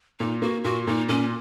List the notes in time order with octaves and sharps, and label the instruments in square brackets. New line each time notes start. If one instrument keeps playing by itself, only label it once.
[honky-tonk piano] A#2 [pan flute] D#4
[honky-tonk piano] A#3 [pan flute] F#4
[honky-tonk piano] A#2 [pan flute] F#4
[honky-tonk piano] A#2 [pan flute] D#4
[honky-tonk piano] A#2 [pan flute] C#4